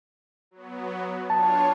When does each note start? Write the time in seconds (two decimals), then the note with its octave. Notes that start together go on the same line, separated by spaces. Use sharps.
0.51 F#3 B3
1.30 D4 F4 C#5 A5